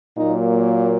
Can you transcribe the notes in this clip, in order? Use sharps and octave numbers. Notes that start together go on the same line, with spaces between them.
A#2 F#3 A#3 D#4